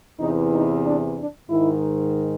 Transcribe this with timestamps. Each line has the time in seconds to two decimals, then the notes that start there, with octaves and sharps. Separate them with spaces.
0.19 E2 C3 E3 D#4
0.52 D#4
0.84 D4
1.17 D4
1.49 G#2 D#3 E4